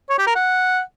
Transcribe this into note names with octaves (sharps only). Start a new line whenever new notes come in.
C#5
G4
A#4
F#5